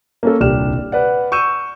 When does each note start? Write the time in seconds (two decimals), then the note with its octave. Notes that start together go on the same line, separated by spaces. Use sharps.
0.23 A#3 C#4 A4
0.40 D#1 C2 D4 G4 F6 E7
0.92 B4 D5 F#5
1.32 C#6 E6 G6 D#7 E7